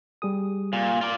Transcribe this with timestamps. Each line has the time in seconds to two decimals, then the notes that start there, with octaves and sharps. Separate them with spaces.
0.22 G3 G#4 D#6
0.73 A#2
1.01 F4 D5